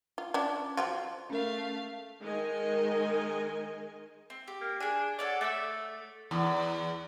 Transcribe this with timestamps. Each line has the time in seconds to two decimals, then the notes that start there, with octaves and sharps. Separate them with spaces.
0.18 F4
0.34 C#4 D4
0.77 F3 F#3 F4
1.30 A3 C#4 A#4 F5
2.22 D#3 G#3 A#4 D#5 G#5
4.30 C4
4.48 G4
4.61 A#3
4.80 D4 G#4 G#5
5.19 A4 C#5 D5 F#5
5.41 A3 D5 D6 E6
6.31 E2